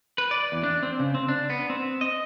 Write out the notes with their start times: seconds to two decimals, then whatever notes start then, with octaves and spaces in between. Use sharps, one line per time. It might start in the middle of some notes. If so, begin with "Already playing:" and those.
0.18 B4
0.31 D5
0.52 E2
0.63 D4
0.83 C4
1.00 C#3
1.15 C4
1.28 D4
1.50 B3
1.70 C4
2.01 D#5